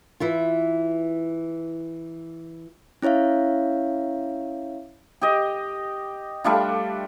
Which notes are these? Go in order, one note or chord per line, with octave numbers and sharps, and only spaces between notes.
E3 E4 F4
C#4 E4 C#5 E5 F5
G4 D#5
G3 A3 D4 F4